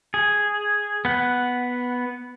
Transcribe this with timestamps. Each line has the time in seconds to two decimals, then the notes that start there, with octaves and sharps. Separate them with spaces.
0.14 G#4
1.05 B3 F#5